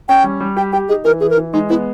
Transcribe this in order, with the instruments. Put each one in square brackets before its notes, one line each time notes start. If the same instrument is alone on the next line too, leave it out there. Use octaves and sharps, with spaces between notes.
[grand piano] C#4 [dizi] G5
[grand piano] G3
G3
[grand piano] G4 [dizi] G5
[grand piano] G4 [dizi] G5
[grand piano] D#4 [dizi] G#4
[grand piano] E3 [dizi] A#4
[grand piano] E3 [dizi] G#4
[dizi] A#4
[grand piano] E3
[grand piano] G#3 [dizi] D#4
[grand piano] B3 [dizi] E4